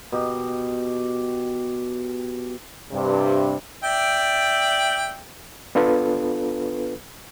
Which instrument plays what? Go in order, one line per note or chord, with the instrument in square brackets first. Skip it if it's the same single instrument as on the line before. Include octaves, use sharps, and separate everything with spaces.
[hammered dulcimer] B2 G4
[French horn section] G2 C3
[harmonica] D5 E5 G5
[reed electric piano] B3 D4 F4 A4 B4